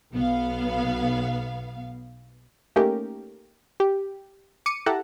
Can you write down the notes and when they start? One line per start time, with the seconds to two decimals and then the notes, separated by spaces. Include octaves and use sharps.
0.13 B1 B3 F5
2.76 A3 A#3 C#4 D#4 G4 A#4
3.80 G4
4.66 D6 C#7 D#7
4.86 E4 G4 A4 F#5 A5 A#5